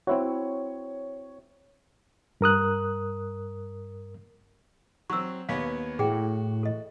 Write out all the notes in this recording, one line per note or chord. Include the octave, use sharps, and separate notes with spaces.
C4 E4 F#4 C#5
G2 A#4 D#6 F#6
F#3 C4 C#6 E6
D#2 B3 C#5 F5
A2 F#4 G#4 G5
A4 D#5